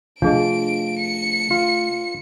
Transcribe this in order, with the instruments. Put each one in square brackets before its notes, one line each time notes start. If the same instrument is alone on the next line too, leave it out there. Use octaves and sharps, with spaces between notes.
[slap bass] C3 A3 [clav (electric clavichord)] F3 [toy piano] D4 G#4 D#5 [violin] D7
[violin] C#7
[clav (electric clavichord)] F4